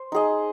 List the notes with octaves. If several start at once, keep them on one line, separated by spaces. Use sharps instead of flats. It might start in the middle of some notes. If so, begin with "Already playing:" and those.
Already playing: C5
D#4 G#4 D#5